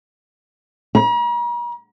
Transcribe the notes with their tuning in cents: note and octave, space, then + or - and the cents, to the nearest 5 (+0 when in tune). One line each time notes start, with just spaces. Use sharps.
A#5 +45